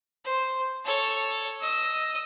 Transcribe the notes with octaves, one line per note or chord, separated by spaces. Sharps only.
C5
A4 C#5
D#5 E6